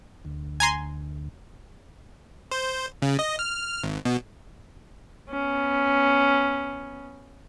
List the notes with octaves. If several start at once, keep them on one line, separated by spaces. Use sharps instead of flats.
D2
G#5 A#5 C6
C5
C#3
D#5
F6
G#1
B2
B3 C#4